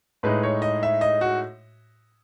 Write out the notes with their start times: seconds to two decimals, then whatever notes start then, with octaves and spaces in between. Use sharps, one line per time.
0.23 A2 G#3 D#4 B4
0.43 C#5
0.62 D#5
0.83 E5
1.01 D#5
1.21 F#4